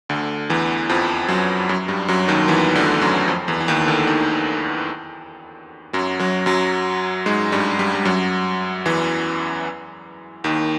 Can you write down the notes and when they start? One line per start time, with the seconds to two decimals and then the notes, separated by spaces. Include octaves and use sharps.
0.09 D2 D3
0.50 E2 E3
0.89 F2 F3
1.28 F#2 F#3
1.69 F#2 F#3
1.88 G2 G3
2.08 F#2 F#3
2.28 D#2 D#3
2.48 E2 E3
2.75 D2 D3
3.01 F#2 F#3
3.28 F2 F3
3.48 E2 E3
3.60 E3
3.68 D#2 D#3
3.87 D2 D3
4.07 D#2 D#3
5.93 F#2 F#3
6.19 F#2 F#3
6.46 F#2 F#3
7.26 G#2 G#3
7.52 G2 G3
7.79 G2 G3
7.95 G3
8.05 F#2 F#3
8.85 E2 E3
10.44 D#2 D#3